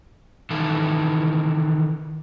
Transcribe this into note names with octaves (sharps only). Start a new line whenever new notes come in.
D#3 E3 E4 A4